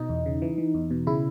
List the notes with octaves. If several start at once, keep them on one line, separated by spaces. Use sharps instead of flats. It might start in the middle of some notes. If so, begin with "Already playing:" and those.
Already playing: B2 D#4
E2
C#3
E3
E3
E2
B2
C#3 E4